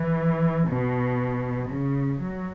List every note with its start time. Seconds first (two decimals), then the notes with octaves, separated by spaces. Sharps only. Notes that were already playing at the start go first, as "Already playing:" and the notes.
Already playing: E3
0.68 B2
1.69 C#3
2.19 F#3